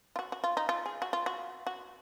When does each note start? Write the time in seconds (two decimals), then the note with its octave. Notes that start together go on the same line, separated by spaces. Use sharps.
0.16 F4
0.19 F#4
0.32 F#4
0.44 F4
0.57 D#4
0.69 F4
0.86 G#4
1.02 F#4
1.13 F4
1.26 F#4
1.67 F#4